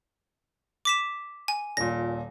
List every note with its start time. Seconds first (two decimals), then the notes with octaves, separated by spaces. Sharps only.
0.85 D6 B6 E7
1.48 G#5
1.77 D#1 A#2 A#6